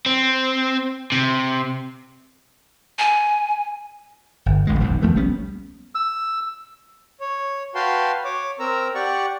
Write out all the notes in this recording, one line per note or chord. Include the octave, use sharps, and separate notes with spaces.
C4
C3
G#5
G1
D1 A1 D2 G#3
D#1 B1 F#2
D2 F3 A3 B3
A#1 G3 B3 C#4
E6
C#5
F#4 B4 F5 G5 A5 C6
C#5 D6
C4 A#4 A#5 E6
G4 D5 F#5 C#6